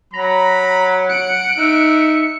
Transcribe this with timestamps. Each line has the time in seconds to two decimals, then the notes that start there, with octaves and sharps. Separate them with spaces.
0.13 F#3 A#5 B5
1.09 F#5 F#6 C#7 D7
1.57 D#4 E5